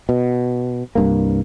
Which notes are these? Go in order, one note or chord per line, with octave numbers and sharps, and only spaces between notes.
B2
C2 G2 A#3